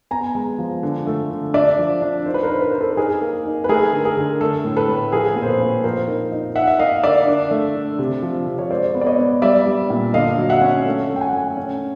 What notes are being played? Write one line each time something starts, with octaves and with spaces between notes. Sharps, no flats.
B3 G#5 A#5
G#3
F3
D3
A3
D3
D4 D5 E5
F3
D4
D#4 C5
B4
A#4 C5
D#4
B4
D#4 C5
A4 B4
B4
D#4 G#4 A#4
A#3
D#4
B4
A3 G#4 A#4
D3
G#4 A#4
D3
A3 A4
A2
A4 B4
A2
F3 G#4 A#4
A#2
C5
A4 B4
A#2
F3 A#4 C5
D#4
D#4
D#4 E5 F#5
E5
A#3 D#5 F5
D3 D5 E5
D4
A3
D4
C3
F3
C3
C#5
G#3 C5 D5
B3
D5
C#5 D#5
B3
G3 D5 E5
G3
A#2
D3 D#5 F5
F#3
E5 F#5
C#4
A3
A3
G5
F#5 G#5
A3
C#4